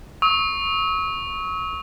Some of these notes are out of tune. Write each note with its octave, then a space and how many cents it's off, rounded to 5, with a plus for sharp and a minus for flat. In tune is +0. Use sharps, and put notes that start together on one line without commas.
C#6 +0 E6 -45